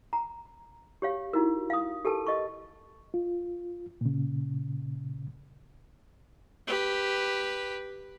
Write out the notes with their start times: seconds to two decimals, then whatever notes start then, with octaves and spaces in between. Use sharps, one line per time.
0.13 A#5
1.02 G4 C#5 F5
1.33 D#4 E4 F#4 A#4
1.70 F5 D#6
2.05 G4 A4 A#4 A5
2.27 D#5 C#6
3.14 F4
4.01 A#2 C#3
6.67 G4 B4